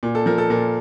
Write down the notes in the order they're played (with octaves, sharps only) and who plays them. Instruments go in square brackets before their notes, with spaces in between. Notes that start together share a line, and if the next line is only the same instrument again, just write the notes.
[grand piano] A#2
A4
F3 A#4
A4
A#2 A#4